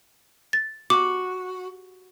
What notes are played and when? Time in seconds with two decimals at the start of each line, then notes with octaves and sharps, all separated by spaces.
0.53 A6
0.90 F#4 D6